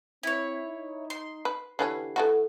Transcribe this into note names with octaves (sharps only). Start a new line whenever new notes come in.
C4 E4 C#5
D#4
C6
B4
D3 E3 C#4 D4 G4 B4 C7
E3 A3 F#4 A4 F#5